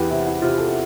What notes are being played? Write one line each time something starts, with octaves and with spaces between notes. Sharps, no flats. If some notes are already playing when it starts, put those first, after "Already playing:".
Already playing: E2 E3 G4 B4
C3 E4
E4
C3 F4
A4